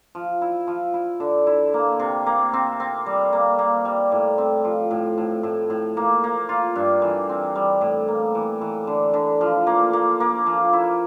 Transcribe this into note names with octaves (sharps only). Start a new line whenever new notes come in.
F3
E4
F3
E4
D3
E4
A#3
C3
A#3
C4
C4
G3
A#3
A#3
G3
A2
C4
F3
A2
A2
A2
A2
A#3
A#3
F4
G2
E3
C4
G3
A2
A#3
E3
E3
D3
D3
F3
A#3
A#3
A#3
F3
E4